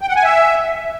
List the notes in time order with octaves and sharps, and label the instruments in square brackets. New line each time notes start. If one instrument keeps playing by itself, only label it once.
[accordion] G5
F#5
G#5
E5